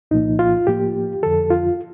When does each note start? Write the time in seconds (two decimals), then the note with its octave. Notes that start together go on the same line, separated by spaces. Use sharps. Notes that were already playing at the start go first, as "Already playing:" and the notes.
0.11 C2 A#2 F3 A#3 D#4
0.39 F4
0.67 A2 F3 A#3 G4
1.23 F2 D3 F3 A4
1.50 F4